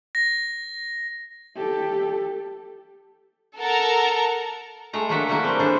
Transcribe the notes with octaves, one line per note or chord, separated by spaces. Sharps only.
A#6
G4 A4
A4 A#4 F#5 A5 A#5
G#3 A3 A#5
F#3 A3 A#3 D4 E5 F#5
F#3 G3 A3 A#3 E4 F#4
G3 C4
D3 G#3 A3 D4 C5